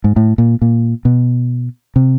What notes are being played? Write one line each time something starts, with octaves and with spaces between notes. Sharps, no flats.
G#2
A2
A#2
A#2
B2
C3